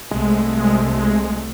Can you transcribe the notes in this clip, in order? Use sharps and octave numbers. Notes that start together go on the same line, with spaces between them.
C2 C3 G#3 A3